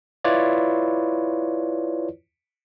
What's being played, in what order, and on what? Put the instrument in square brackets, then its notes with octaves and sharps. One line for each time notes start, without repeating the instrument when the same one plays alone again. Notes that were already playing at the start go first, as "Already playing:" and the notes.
[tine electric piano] E4 F4 B4 C#5 D5